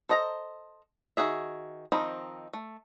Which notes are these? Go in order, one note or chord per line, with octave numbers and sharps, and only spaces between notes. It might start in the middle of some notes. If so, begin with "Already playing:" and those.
A4 C5 D#5 F#5 A#5
D#3 F#4 G#4 E5
D#3 F3 C4 D#4 B5
A3